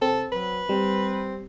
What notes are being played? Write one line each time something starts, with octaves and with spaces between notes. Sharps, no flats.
C3 C4 A4
F#3 B4
G3 C4